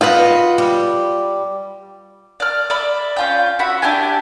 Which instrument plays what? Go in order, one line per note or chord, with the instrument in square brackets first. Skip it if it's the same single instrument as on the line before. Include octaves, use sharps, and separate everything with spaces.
[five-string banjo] F4 B4 [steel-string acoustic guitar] F#4 D#5
[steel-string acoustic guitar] G3
[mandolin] D5 F6
D5 E5 B5
C#4 F4 G5
F#4 E5 B5
D4 E4 G4 G#5